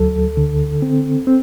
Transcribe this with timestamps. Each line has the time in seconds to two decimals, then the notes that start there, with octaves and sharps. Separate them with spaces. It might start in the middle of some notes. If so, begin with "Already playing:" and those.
Already playing: D2 F#3 A4
0.37 D3
0.82 C4
1.27 C4